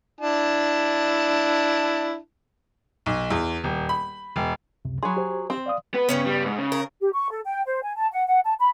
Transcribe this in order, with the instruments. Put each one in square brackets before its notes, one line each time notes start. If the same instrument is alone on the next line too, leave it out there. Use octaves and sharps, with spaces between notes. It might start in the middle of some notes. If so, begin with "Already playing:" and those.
[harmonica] D4 E4 A5
[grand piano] B1
E2
D#1
B5
E1
[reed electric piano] C#2 F#2 C3
[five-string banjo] F#3 G#4 [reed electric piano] B5 C6
[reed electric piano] G4 C5
[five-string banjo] C4
[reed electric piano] D5 F5 D#6
[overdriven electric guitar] B3 B4
[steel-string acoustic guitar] G2 C#3 B3 [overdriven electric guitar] C#4
[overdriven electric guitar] G3
G#2
C#3
[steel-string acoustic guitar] A#4
[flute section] G4
C#6
A4
G5
C5
G#5
A5
F#5
F#5
A5
B5